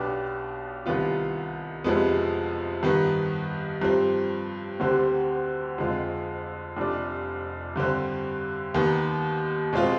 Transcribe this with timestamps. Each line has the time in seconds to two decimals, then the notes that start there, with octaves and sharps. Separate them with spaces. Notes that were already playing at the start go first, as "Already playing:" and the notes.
Already playing: B1 B2 B3 D4 G4
0.86 C2 C3 D#3 B3 F4
1.84 F2 C3 F3 G#3 B3
2.83 G2 D#3 B3
3.82 G2 F3 C4
4.80 D2 D3 G3 C4 G4
5.78 F2 D3 G#3 C4 F4
6.77 F1 F2 C3 G3 D4
7.76 G2 D3 G3 C4
8.74 D#2 D#3 B3
9.73 B2 G#3 C4 F4